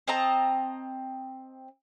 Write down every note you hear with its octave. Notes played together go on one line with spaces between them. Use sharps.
C4 D#5 A5 A#5